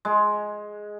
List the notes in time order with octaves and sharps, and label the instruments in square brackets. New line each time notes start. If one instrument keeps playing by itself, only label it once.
[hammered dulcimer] G#3